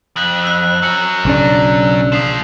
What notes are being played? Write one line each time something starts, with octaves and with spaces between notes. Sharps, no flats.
F2 F#6 F#7
E6 F#6
F#3 C#4 E6 C#7
B1 C#3 D4
F3 A#3 D#6 C7 E7